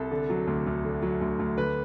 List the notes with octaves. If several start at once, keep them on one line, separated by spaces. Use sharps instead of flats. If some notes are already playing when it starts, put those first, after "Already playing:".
Already playing: C2 A4
D3
F#3
D2
D2
D3
F#3
D2
D2
D3 B4